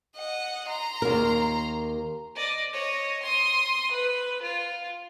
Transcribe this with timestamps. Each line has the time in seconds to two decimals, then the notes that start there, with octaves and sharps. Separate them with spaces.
0.16 D#5 F#5
0.68 A#5 C6
1.02 D#2 A#4
2.35 D5 D#5
2.73 C#5 D#5
3.22 C6 D#6
3.91 B4
4.42 F4